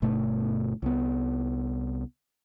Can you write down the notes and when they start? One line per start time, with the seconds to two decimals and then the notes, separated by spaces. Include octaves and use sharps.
0.02 G1 B2 A3
0.82 C2 B3